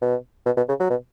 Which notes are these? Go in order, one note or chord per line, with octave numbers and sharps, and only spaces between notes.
B2
B2
B2
C#3
F#3
B2